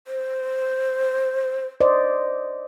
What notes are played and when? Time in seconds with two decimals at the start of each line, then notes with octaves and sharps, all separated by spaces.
0.07 C5
1.81 C5 D5 D#5